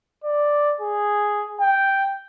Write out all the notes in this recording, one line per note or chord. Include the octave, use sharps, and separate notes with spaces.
D5
G#4
G5